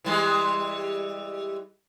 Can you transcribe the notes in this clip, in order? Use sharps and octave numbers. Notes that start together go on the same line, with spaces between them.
E3 G3 G#3